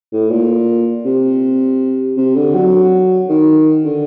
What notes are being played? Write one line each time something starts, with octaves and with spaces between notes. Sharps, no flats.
A2
A#2
C3
C3
D3
F#3
D#3
D3